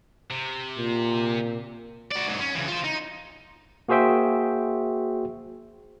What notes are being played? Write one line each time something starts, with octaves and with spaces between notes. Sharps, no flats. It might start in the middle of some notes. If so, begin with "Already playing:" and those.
C3
A#2
F#4 D5
G#2 F#3
C#4
C#3 E3
F4 C5
D#4
A#3 F#4 G#4 C5 E5 G5